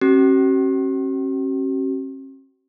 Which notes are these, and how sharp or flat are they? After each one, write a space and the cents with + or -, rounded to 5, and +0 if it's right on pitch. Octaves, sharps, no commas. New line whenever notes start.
C#4 -45 F#4 +45